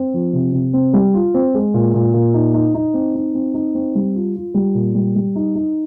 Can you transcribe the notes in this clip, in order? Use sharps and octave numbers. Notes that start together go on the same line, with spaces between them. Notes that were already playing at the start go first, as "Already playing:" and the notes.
Already playing: C4
F3
C3
C3
C4
G3
F4
C4
G#3
A#2
A#2
A#2
D#4
D#4
D#4
C4
D#4
C4
D#4
C4
G3
F4
F4
G3
A#2
G3
G3
D#4
D#4